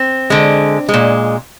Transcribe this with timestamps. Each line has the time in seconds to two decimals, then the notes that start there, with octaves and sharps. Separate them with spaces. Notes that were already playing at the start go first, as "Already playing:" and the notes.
Already playing: C4
0.30 D3 G#3
0.89 G#3
0.94 A#2